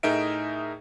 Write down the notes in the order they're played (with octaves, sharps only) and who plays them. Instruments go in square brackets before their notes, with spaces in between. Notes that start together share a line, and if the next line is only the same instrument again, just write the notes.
[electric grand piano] A2 D#4 G#4 A#4 E5 D7